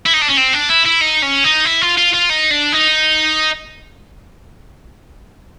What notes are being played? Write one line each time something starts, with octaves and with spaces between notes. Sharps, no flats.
E4
D#4
D4
C#4
C4
D4
E4
E4
D#4
C#4
D#4
E4
F4
F4
F4
D#4
D4
D#4